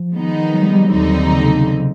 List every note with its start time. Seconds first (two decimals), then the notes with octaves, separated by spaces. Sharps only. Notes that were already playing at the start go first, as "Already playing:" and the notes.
Already playing: F3
0.14 D#3 G#3 B3 D#4
0.54 F#3
0.63 G3
0.73 G3
0.82 F#3
0.92 D#2 D3 G3 C4 D#4
1.31 C#3
1.43 C3
1.55 C#3